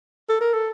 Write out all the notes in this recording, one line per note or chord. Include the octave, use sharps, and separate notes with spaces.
A4
A#4
A4